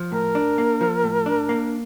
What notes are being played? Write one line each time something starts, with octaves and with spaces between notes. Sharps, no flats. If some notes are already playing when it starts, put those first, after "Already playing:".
Already playing: F3
A2 A#4
D4
A#3
F3
A2
D4
A#3